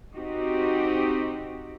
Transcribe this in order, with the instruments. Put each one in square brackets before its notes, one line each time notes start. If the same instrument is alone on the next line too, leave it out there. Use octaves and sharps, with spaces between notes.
[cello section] C4 D#4 F#4 G4